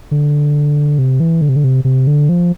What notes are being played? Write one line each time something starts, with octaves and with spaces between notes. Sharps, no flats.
D3
C3
E3
D3
C3
D3
C3
C3
D3
F3